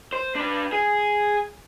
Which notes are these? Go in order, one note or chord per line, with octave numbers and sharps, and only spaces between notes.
C5
D4 B4
G#4